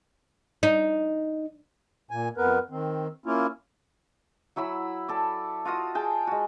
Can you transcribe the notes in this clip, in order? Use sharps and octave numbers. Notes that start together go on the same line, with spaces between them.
D#4
A#2 G#5
F2 B3 A#4 B4
D#3 C4
A#3 C#4 E4 F4
F#3 E4 B5 E6
A4 D5
F4 F#4 D#5 D#6
G#4 G5 A5
G#3 F#4